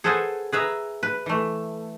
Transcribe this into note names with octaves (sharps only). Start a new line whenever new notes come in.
G#4 A4 B4 C5 F#5 G#5
G#4 B4 E5 A#5
B4
E3 A3